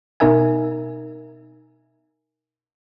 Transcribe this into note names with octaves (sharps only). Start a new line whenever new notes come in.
B2 D#4 A#4 E5 G#5